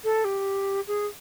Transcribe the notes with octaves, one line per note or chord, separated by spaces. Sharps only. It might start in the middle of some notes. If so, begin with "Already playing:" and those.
A4
G4
G#4